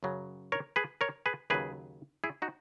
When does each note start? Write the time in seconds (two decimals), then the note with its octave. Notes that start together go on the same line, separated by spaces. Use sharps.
0.03 F#2 C#3 F#3
0.52 A#4 C#5
0.76 G#4 B4
1.01 A#4 C#5
1.26 G#4 B4
1.50 D#2 C#3 F#3 G#4 B4
2.24 E4 G#4
2.42 D#4 F#4